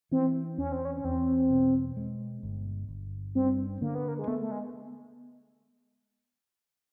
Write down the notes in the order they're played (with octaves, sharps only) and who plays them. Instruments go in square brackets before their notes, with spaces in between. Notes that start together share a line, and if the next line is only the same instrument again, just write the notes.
[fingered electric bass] E3 [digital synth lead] C4
[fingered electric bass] E2 [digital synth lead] C#4
[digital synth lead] C4
C#4
C#4
[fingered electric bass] E2 [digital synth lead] C4
[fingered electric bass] B2
G#3
G1
G1
[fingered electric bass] G2 [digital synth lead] C4
[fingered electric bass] D3 [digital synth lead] A#3
[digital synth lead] B3
A#3
G#3
[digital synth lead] A3 [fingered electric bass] B3
[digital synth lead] A3
G#3